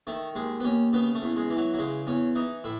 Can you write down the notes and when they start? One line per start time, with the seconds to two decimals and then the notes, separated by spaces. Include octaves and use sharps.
0.07 D#3 A3
0.35 D#2 G#3
0.60 B3
0.64 D#2 C#4
0.93 C#3 B3
1.15 A3
1.22 E2
1.36 G#3
1.50 E3
1.57 F#3
1.74 F#3
1.78 C#3 G#3
2.07 E2 C#4
2.35 E3 D#4
2.64 A2 E4